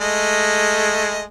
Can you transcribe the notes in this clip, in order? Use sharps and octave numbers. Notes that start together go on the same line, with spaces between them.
G#3 A3 D#5